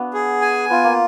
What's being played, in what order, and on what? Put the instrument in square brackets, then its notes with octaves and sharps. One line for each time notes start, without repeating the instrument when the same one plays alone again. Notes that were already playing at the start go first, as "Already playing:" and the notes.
Already playing: [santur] B3 D4 F#4
[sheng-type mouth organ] G#4
G#5
[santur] B3 [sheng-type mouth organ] F4
[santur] A#3